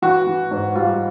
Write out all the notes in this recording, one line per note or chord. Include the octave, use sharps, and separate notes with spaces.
E3 F#4
E3
G#2
G3 F4